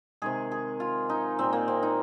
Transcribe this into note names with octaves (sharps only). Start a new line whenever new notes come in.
C3 D#3 G#3 G#4
G#4
F4
D#4
A#2 G#3 C4
A#3
C4
D#4